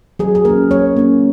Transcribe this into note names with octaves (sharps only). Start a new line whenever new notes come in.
F#3 G#4
G#4
A#3 C#4 A#4
F#3 C#5
A#3 C#4